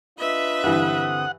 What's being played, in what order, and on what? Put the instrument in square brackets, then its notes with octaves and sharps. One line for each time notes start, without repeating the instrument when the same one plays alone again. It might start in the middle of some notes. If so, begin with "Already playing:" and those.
[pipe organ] D4 F4 D#5 [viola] B4 E5
[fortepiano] G2 E3 [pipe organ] D3 C4 D#6 [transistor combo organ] F#5